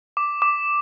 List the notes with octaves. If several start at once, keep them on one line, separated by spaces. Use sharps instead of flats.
D6
D6